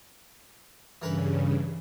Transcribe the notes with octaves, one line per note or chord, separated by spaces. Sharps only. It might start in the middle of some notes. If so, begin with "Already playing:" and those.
G2 C#3 E3 A#4 B4